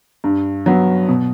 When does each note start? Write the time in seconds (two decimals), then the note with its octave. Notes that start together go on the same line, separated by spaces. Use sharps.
0.24 G2
0.66 F#3 B3
1.08 B2